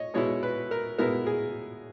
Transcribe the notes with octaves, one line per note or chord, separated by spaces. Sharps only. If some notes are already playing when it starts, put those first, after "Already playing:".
Already playing: C#5 D#5
B2 G#3 B3 E4 C#5
B4
A#4
B2 G#3 B3 E4 A#4
G#4